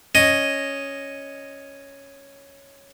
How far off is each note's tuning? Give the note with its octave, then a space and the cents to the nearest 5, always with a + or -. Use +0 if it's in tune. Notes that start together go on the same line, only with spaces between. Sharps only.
C#4 +0 D#5 +0